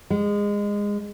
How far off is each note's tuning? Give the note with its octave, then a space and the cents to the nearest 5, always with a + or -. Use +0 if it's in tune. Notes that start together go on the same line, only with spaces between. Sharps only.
G#3 -20